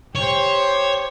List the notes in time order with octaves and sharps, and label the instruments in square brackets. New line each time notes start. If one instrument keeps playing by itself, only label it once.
[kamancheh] G4 C5 [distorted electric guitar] C#5